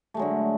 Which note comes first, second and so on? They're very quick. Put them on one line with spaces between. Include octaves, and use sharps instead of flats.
A3 G#3 F#3 D3